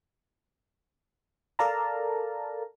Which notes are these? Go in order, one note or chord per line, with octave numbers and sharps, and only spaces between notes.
A4 A#4 D5 F5 A5 A#5